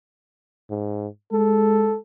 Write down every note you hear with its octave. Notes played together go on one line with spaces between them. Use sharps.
G#2
G#3 A4